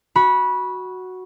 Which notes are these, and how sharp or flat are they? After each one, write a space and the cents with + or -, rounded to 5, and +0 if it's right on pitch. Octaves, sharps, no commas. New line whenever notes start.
F#4 +0 B5 -20